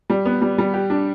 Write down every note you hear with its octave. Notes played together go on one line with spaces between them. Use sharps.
G3
B3
G3
G3
G4
D4